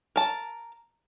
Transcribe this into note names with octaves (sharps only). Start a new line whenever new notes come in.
A#4 A5